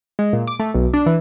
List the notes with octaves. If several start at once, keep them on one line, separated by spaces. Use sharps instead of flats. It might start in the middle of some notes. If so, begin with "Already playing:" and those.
G#3
A#2
D6
A3
B1
D4
E3